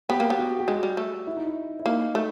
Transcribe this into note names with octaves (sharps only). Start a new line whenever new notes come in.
B3 G4
A#3
B3
F#4
G4
G#3 F#4
G3
A3
E4
D#4
E4
E4
A#3 D#4
A3